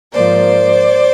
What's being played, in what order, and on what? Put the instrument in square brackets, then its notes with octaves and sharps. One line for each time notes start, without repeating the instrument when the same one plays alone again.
[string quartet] G#2 F3 A#3 C5 D5